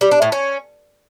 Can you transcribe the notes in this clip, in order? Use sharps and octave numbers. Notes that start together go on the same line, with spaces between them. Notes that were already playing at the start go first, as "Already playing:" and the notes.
G3
D4
A2
C#4